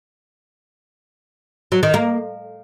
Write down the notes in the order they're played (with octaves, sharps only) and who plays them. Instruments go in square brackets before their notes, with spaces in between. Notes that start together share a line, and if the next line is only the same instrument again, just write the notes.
[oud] F#3
D#3
A#3